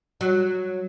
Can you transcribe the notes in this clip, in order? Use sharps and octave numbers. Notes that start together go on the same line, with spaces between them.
F#3